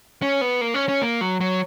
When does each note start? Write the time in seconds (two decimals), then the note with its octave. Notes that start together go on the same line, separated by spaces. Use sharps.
0.22 C#4
0.41 B3
0.61 A#3
0.74 C#4
0.88 C#4
1.02 A#3
1.21 F#3
1.40 F#3